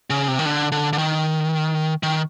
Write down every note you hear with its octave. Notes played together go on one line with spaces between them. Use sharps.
C#3
C3
D#3
D3
D3
D3
D#3
D#3